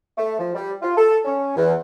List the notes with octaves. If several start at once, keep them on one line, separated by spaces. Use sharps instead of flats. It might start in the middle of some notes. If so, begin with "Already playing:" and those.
A3
F3
G3
F4
A4
C#4
E2